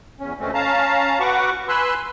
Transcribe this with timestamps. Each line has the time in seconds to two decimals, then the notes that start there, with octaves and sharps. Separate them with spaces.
0.20 E2 C#4
0.39 D2 B2 A3 C4 C#4
0.54 C#4 F5 A5 A#5
1.20 F#4 B4 F#5 C#6 D6
1.68 B4 G#5 B5 C6 E6 F#6